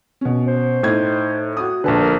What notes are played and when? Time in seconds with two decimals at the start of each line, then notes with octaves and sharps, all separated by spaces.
0.21 B2 C#4
0.47 C5
0.83 A2 D#4 G#6
1.57 F#4 D#6
1.84 A#1 D3 B4 A5
1.98 A#4